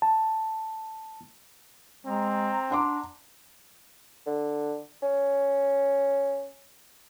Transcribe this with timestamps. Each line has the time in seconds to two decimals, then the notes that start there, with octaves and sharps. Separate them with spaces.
0.02 A5
2.05 G#3 C4 A#5
2.70 D4 F#5 C6 D6
4.26 D3
5.02 C#4